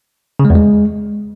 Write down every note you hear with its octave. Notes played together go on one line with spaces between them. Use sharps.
C#3
G#3
E2
G#3